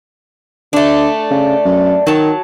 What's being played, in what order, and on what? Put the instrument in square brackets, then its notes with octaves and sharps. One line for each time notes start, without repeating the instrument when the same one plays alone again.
[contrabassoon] D3 [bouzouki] A3 D4
[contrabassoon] C#3
F#2
[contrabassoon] D#3 [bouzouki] F#3 A5